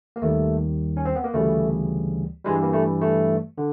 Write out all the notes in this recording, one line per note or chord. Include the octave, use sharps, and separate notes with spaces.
A#3
D#2 D#3 G3 A3
C#4
C4
B3
A#3
D2 C#3 E3 G3 A3
G2 E3 G3 G#3
A#3
A3
A3
D3